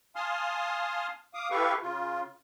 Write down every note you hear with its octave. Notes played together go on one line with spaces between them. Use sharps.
F5 G#5 A5 C6 D#6 F6
F5 D6 D#6
E4 G4 A4 B4 F5 C#6
C#3 F4